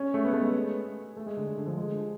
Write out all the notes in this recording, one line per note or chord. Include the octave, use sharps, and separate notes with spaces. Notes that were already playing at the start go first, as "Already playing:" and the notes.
Already playing: C#4
A3
B3
A3
G#3
A3
G#3
D3
D3
D3
F3
G#3